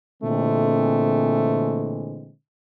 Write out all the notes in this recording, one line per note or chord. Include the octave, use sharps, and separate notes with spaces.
A#2 D3 E3 G#3 A3 C4